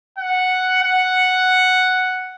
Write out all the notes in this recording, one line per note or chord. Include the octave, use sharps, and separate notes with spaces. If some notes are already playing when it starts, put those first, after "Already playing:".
F#5
F#5